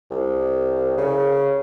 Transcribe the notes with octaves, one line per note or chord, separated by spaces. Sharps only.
C2
C#3